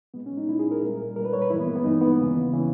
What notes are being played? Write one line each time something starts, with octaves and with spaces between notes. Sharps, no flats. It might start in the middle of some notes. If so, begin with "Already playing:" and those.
A#2 G#3 B3
C#4
D#4
A#2 G#3 E4
G#4
A#4
A#2 G3
A#2 G3 A#4
B4
C#5
B4
G2 E3 G#3 E4
B3
A#3
B3
G2 E3 G#3 D#4
B3
D#2 C#3 E3
C#3 E3